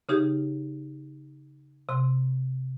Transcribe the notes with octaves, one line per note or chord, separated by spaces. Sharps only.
C#3 D#4 G4 G#4
C3 C6